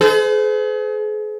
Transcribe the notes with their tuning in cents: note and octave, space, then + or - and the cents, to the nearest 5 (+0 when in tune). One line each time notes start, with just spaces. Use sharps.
G#4 +40 C5 -45